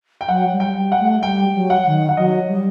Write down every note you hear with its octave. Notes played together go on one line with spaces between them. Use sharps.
G5
F#3 F#5
G3
G5
G3
F#5
A3
G3 G5
F#3
F#5
D#3
F#5
F#3 D#5
G3